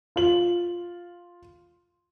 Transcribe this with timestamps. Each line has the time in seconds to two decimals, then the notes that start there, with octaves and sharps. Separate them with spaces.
0.16 F4 F#7